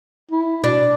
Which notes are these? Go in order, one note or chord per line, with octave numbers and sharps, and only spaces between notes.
E4
B2 D4